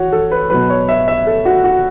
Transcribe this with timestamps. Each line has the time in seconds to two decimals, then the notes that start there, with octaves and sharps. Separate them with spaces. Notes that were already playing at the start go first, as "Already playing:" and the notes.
Already playing: E3 F#4 C#5
0.12 A4
0.31 B4
0.50 B2 F#3 B4
0.70 C#5
0.89 E5
1.08 E5
1.27 A4
1.45 F#4
1.64 F#4